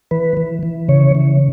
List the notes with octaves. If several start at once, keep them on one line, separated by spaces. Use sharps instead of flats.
E3 B4
E3
E3
C#3 C#5
E3